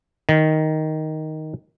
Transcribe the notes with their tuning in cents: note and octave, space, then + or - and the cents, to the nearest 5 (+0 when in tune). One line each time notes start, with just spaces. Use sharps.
D#3 +5